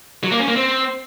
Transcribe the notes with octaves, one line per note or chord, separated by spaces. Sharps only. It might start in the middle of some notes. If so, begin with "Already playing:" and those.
F#3
A#3
C#4
A#3
C4